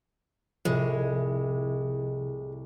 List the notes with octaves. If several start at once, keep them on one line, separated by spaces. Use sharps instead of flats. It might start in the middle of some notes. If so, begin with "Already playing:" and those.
C2 A2 C3 F3 G#3